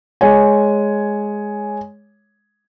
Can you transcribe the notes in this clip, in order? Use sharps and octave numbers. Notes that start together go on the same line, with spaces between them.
G#3 C#5 G#5